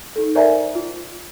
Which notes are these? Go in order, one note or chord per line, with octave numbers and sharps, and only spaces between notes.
D#4 A4
A#4 C5 D5 E5 G#5 A#5
F4